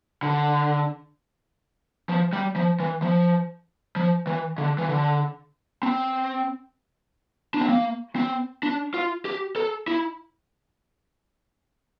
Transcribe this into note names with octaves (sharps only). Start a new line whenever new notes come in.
D3
F3
G3
F3
E3
F3
F3
E3
D3
E3
D3
C4
D4
C4
A#3
C4
D4
F4
G4
A4
E4